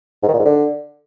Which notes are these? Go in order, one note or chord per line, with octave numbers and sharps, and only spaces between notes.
G#2
D#3
A#2
G#2
D3